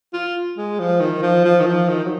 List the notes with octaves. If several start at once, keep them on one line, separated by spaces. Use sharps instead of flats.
F4
G#3
F3
D#3
F3
F3
D#3
F3
D#3
F#3